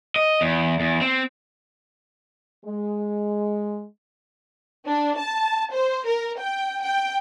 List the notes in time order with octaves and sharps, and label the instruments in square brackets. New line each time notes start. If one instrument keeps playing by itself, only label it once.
[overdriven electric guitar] D#5
E2
E2
C4
[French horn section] G#3
[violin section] D4
A5
C5
A#4
G5
G5